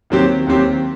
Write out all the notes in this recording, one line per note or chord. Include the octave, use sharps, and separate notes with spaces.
D#2 D#3 F#3 C4 G4
D#2 D#3 F#3 C4 G4